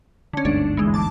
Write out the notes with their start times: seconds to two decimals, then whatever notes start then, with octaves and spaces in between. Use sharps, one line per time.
0.33 D3 C#4
0.45 G1 D2 G#2 D4
0.77 E3 G#3
0.94 A5 D6